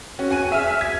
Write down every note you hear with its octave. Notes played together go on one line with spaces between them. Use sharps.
C#4 F#4
F#4 G#5 D#7
G#4 E5 G#5 F6
G#6 B6